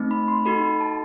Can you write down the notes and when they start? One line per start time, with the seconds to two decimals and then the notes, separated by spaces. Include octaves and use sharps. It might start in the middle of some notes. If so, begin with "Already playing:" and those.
Already playing: A3 C4 D#4
0.11 B5
0.28 C6
0.45 D#4 F#4 A4 B5
0.81 A5